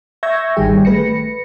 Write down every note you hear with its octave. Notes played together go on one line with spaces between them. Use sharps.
E5 C#6 E6 G6 G#6 A#6
G#1 D#3 G3 G#4 G5
A3 B4 A#6 C#7